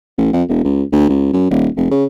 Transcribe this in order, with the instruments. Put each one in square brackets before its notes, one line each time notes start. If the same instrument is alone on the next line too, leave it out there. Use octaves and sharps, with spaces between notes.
[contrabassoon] A1
F2
E1
C#2
D2
C#2
F#2
D#1
F1
C#3